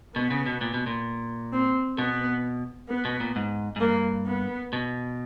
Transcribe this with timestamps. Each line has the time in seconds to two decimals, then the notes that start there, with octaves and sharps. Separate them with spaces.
0.15 B2 B3
0.31 C#3
0.46 B2
0.61 A#2
0.74 B2
0.86 A#2
1.53 C4
1.98 B2 B3
2.89 B3
3.05 B2
3.20 A#2
3.36 G#2
3.76 G#2
3.81 G2 A#3
4.26 B3
4.73 B2